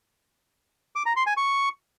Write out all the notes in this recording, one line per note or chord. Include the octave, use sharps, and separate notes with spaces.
D6
A#5
C6
G#5
C#6